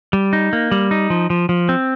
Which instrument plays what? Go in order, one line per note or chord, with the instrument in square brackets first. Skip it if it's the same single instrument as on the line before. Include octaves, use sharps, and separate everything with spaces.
[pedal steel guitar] G3
D#4
A#3
G3
D#4
F3
F3
F3
C4